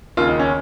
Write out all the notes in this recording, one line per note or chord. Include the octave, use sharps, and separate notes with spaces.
D#2 C#3 F4
D#4
C#4